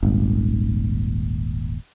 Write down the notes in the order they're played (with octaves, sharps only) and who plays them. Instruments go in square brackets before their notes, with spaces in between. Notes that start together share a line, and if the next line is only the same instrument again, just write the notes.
[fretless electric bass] D#1 G#1